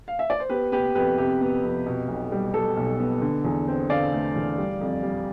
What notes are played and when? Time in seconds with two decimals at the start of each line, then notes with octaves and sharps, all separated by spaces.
0.08 F5
0.19 E5
0.30 D5
0.40 C5
0.50 B3 G4 B4
0.72 B3 G4 B4
0.95 F2 G4 B4
1.17 C3 G4
1.41 B3
1.63 F2
1.86 B2
2.08 B1
2.32 G3
2.54 G3 A4
2.77 B1
3.00 B3
3.22 D3
3.45 E2
3.68 C4
3.90 D3 D5 F5
4.13 A3
4.36 E2
4.58 G3
4.81 F2
5.03 G3